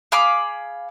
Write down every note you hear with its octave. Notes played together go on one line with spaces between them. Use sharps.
G#4 F5 B5 D6